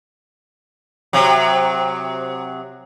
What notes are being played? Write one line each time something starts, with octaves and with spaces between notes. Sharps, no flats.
C3 F#3